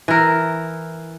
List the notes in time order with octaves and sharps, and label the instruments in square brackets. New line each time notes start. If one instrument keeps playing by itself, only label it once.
[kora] E3 A#4